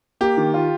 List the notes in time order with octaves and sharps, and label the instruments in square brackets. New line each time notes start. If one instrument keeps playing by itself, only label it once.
[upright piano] A#3 [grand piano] G4
[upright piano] D#3
F4